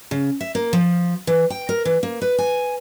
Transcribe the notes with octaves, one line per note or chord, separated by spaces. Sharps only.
C#3
E5
A#3
F3
E3
G5
A#4
E3
A#3
B4
G#5